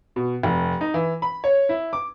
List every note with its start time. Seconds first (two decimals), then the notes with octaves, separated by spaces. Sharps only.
0.16 B2
0.43 F1
0.81 D#4
0.94 E3
1.22 B5
1.44 C#5
1.69 E4
1.93 D6